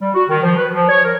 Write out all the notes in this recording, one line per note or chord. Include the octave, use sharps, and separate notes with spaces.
G3
F#4
D#3
F3
B4
F3
C#5
A#4